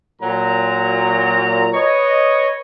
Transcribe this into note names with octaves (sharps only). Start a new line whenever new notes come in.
A#2 F#3 A#5
B4 C#5 D#5